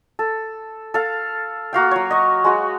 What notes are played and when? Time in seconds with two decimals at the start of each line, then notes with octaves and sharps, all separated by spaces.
0.19 A4
0.94 A4 F5
1.73 A#3 F#4 F5 G5
1.91 F#3 C#5
2.11 D#5 C#6
2.45 G#3 F#4